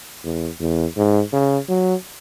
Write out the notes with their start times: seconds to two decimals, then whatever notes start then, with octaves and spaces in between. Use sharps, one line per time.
0.25 E2
0.60 E2
0.96 G#2
1.33 C#3
1.69 F#3